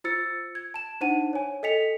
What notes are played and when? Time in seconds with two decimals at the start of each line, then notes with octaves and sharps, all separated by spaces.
0.04 F4 C5 E6 A6 C#7
0.55 G#6
0.74 A5 E7
1.01 D4 D#4 C5 F#5 A5 D#7
1.33 C#5 G#5
1.63 A4 D#5 G5 B6 C#7 F7